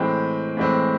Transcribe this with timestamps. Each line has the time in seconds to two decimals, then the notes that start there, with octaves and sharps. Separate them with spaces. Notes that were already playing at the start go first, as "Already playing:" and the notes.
Already playing: A2 E3 G#3 C4 G5
0.57 A2 E3 G#3 C4